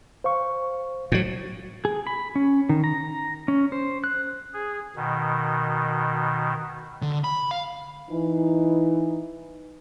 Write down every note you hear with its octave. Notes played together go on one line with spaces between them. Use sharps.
C5 F5 C#6
A2 F#3
G#4
B5
C#4
D#3
A#5
C#4
C5
F#6
G#4
B2 D#3
D3
B5
F5
E3 D#4